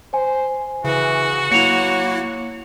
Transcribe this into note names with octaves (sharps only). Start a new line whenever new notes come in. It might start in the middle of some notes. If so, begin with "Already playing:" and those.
C5 G#5
C#3 E3 F#4
F#3 A#3 E4 C#7 F7